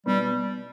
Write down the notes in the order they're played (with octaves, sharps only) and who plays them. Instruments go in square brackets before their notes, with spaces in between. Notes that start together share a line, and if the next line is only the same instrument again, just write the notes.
[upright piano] B2 B3 [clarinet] G3